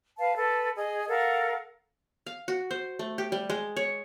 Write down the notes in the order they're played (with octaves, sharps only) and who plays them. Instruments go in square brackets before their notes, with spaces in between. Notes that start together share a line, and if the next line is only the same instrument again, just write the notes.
[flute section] B4 F5 A5
A4 B4 A5
G#4 D#5
A4 A#4 F5 F#5
[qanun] F5
F#4
C5
A3
G4
G3
G#3
C#5